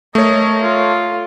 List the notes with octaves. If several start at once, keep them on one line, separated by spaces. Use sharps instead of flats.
A3 A#4 C#5 D#5
F4